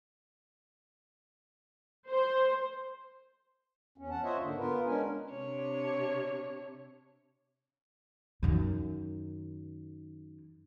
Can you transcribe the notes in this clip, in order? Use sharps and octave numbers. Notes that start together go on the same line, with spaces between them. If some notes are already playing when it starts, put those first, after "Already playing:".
C5
E2 C#4
F#5 A5
F4 C5 C#5 D#5 E5 F#5
G#2 D3 A#3 D4
B3 F4 A#4 B4
G#3 C#4 D4 A#4 G#5
C3 D4 C#5
F#2 D#3